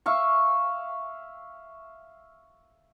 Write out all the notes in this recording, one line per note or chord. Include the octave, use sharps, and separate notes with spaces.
E5 F5 C#6